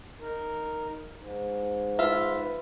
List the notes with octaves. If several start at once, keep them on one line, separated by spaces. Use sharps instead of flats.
D#4 A#4
G#2
F4 B4 E5